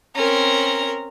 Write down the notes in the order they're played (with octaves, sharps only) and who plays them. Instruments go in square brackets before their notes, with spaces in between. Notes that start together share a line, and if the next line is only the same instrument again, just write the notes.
[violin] C4 C#4 [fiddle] A#4 A#5